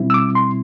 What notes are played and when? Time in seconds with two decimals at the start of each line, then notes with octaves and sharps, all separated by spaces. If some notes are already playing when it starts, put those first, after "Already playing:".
Already playing: B2 G3 C4 E4
0.10 E6
0.14 D6
0.35 C6